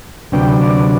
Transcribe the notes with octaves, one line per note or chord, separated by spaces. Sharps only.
D2 C3 F#3 B3 D4 G5
D5